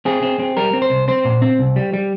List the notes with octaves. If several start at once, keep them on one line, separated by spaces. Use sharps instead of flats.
C4 G#4
C4
C4
G3 A#4
C4
C5
C2
C4 C5
A#2
C4
C2
G3
G3